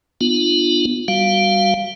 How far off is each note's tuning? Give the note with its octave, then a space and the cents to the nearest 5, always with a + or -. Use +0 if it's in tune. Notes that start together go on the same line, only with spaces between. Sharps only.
B3 +0 D4 +45 F4 +0
G3 +0 F#4 +0 F5 -5